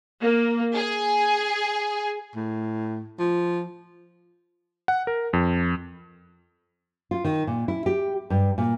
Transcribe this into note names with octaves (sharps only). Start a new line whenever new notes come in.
A#3
G#4
A2
F3
F#5
A#4
F2
F4
D#3
A#2
E4
G4
G2
A#2